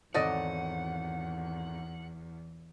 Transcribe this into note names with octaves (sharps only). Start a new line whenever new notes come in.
G#1 E2 F#3 A4 D5 D#5 F#5 D#7